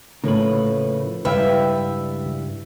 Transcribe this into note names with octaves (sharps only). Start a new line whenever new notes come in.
A2 C#3 F3 A#3 B4
C#2 G2 G3 E4 B4 E5 F5 G5